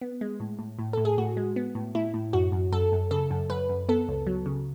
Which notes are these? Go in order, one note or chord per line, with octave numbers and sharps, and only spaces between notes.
B3
G#3
A2
A2
A2
A2 A4
G#4
A2 F#4
G#3
B3
A2
A2 E4
A2
F#2 F#4
F#2
F#2 A4
F#2
C#3 A4
F#2
F#2 B4
F#2
B3 A4
C#2
F#3
C#3